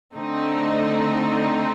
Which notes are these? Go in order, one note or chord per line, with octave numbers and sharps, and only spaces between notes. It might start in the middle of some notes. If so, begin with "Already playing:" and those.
D3 A3 C4 D#4